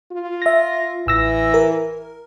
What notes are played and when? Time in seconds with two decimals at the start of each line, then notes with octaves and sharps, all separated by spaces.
0.12 F4
0.42 E5 A#6
1.07 A1 E3 E6 A#6
1.54 A#4